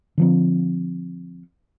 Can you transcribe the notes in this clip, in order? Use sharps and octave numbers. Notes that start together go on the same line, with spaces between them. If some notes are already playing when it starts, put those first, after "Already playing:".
D3 F3 C4